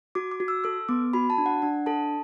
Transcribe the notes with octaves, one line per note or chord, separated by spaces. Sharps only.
F#4 D6
D6
F#4
E6
A4 E6
B3 D6
F#4 B5
A5
D4
F#5
D4 F#5
A4 A5